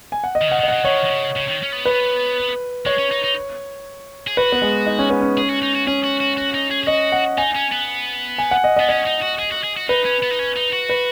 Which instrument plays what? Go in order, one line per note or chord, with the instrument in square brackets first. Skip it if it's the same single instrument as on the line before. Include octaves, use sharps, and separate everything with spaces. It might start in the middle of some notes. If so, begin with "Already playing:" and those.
[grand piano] G#5
F#5
D#5
[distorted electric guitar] D#3
[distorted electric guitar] C#3 [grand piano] F#5
[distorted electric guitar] D#3 [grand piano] D#5
[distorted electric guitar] C#3 [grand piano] F#5
[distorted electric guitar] D#3 [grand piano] C#5
[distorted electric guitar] D#3
C#3
C#3
D#3
C#4
B3
[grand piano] B4
[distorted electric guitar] G#3 [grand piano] C#5
[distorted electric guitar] C#4
D#4
D#4
G#4
[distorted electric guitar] F#4 [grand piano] B4
[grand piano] B3
G#3
D#4
C#4
B3
C#4
[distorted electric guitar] G#4
F#4
D#4
F#4
[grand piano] C#4 [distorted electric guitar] G#4
[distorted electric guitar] F#4
F#4
F#4
D#4
G#4
G#4
[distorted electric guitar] F#4 [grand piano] D#5
[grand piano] F#5
[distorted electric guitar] D#4 [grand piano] G#5
[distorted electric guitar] C#4
B3
[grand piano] G#5
F#5
D#5
[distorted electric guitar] B3 [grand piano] D#5
[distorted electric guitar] C#4 [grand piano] D#5
[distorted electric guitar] D#4
F#4
G#4
F#4
G#4
F#4
[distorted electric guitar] D#4 [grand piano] B4
[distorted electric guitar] C#4
B3
D#4
C#4
D#4
F#4
[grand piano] B4